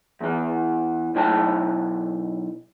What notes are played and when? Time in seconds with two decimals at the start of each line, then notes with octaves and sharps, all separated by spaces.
0.21 E2 E3
1.15 B1 E4 G5 A5